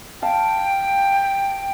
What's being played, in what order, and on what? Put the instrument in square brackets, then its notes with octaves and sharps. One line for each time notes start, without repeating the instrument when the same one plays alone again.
[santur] F5 A5 [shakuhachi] G5